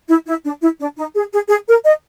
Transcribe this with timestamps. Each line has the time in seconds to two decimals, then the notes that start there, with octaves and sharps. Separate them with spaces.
0.09 E4
0.26 E4
0.44 D4
0.61 E4
0.79 D4
0.97 D#4
1.14 G#4
1.32 G#4
1.49 G#4
1.67 A#4
1.85 D#5